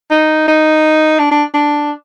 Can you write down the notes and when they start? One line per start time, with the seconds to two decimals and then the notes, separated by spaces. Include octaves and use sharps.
0.11 D#4
0.48 D#4
1.19 D4
1.31 D4
1.54 D4